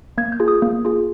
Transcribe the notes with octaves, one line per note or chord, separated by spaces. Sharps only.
A#3 G#6
G6
F4 G#4
D#6
A#3
F4 G#4